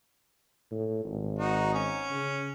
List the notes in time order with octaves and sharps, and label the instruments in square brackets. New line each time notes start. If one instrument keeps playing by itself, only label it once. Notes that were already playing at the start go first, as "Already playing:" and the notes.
[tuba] A2
G#1
[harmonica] D#4 F#4
C#4
[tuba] C#3